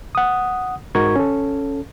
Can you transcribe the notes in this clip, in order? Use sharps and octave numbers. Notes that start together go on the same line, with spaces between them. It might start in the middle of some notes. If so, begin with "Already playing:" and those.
F#5 D#6
G#2 D#4 F#4 A#4 C#6 G#6
C#4 A4